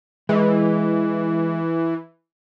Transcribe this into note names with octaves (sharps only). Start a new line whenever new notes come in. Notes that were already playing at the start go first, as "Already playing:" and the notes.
E3 G#3